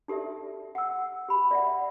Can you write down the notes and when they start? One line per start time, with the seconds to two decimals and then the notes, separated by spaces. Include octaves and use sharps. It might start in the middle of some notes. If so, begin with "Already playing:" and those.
0.08 D#4 G4 A4 D5 E5
0.75 F#5 E6
1.28 G4 B5
1.51 D5 E5 F#5